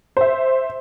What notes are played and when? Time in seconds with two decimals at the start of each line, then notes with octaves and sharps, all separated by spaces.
0.17 C5 E5